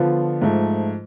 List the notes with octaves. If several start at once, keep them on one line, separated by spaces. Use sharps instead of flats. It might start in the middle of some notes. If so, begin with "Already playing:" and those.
Already playing: D3 F3 B3 D4 F4
G#2 F3 A3